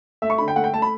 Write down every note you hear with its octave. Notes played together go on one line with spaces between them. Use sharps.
A3 E5
C#6
D3 B5
G5
A3 F#5
G5
A3 A5
B5